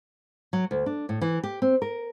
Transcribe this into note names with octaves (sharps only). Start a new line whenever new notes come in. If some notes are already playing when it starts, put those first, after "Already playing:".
F#3
D2
D4
A2
E3
G4
C4
A#4